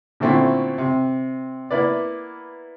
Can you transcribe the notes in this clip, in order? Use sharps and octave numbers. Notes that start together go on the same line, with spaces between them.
A#2 D3 A3 C4 C#4 E4
C3
A#3 B3 E4 B4 D5